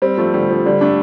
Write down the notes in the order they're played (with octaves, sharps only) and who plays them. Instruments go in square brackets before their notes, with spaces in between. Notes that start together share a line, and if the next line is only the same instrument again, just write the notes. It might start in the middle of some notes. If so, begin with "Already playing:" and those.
[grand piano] G3 C4
F3 A3
D3 G3
F3
D3 G3
A3 D4